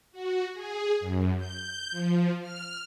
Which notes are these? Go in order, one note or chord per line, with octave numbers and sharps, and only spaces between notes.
F#4
G#4
F#2
G6
F3
F6